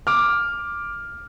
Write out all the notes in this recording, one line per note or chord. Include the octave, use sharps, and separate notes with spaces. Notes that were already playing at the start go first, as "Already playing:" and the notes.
D6 F6